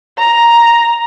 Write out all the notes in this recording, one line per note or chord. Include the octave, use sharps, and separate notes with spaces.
A#5